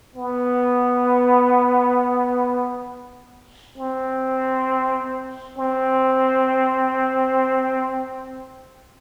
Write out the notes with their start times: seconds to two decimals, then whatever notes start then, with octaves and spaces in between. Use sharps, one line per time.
0.15 B3
3.78 C4
5.58 C4